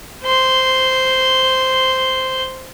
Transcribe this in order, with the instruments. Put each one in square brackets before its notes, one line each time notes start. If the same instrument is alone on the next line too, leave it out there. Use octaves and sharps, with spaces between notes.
[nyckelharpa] C5 C6